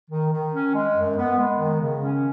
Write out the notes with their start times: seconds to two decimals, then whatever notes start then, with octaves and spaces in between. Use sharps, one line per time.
0.10 D#3
0.33 D#3
0.53 C#4
0.75 G#3
0.95 F#2
1.16 B3
1.38 G#3
1.58 D#3
1.80 C#3
2.00 C#4